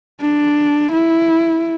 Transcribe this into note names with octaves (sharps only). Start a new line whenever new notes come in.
D4
E4